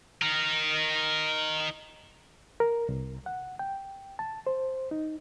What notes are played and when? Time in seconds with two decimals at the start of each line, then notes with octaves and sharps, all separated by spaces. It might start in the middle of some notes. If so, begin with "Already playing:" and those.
0.22 D#4 A#4
2.60 A#4
2.89 C2
3.26 F#5
3.59 G5
4.19 A5
4.47 C5
4.91 D#4